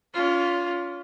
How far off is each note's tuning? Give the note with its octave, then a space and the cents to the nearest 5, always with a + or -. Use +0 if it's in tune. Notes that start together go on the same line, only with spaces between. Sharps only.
C#4 +35 F4 +0